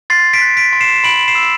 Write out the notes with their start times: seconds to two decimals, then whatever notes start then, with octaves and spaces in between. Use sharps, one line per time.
0.10 C6 A6 C7
0.33 B6 D7
0.42 F#6
0.57 B6 D7
0.73 C6
0.81 C7 E7
1.04 B5 D7 F#7
1.28 C7 E7
1.35 E6